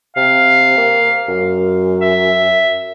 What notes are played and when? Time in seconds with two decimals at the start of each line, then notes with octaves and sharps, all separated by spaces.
0.17 C3 F5
0.77 A#3
1.28 F#2
2.01 E5